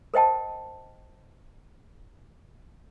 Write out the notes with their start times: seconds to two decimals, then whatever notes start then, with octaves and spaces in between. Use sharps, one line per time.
0.14 A#4 C5 D#5 G5 A5